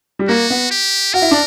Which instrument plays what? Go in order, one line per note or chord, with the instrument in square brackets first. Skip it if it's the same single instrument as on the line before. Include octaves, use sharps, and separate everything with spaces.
[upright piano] G3
[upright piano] A#3 [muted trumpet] F#4
[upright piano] B3
[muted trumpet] G4
[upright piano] F#4 [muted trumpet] A#4
[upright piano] E4
D4